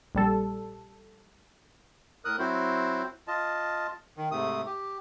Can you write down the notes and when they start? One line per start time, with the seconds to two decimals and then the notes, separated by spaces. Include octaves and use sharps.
0.15 A#1 G3 A4
2.25 A2 A#4 D#6 F#6
2.39 F#3 C4 E4 F#4 C5
3.28 F4 D#5 A5
4.17 D#3
4.31 G#2 C3 A3 D#6
4.66 G4